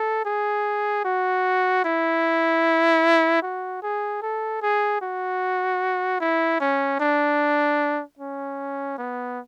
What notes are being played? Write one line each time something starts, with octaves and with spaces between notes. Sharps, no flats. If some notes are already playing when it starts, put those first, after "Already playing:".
Already playing: A4
G#4
F#4
E4
F#4
G#4
A4
G#4
F#4
E4
C#4
D4
C#4
B3